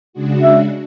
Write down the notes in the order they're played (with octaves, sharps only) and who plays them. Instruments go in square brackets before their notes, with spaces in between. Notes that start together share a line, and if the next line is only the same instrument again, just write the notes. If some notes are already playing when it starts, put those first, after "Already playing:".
[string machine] C#3 G#3 D4 F#4
[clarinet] E5